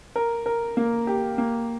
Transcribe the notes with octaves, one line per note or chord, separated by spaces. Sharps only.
A#4
A#4
A#3
G4
A#3